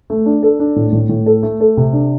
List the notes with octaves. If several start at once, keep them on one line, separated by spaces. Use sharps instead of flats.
A3
D4
A4
D4
A2
A2
A2
A4
A3
A4
C3
D4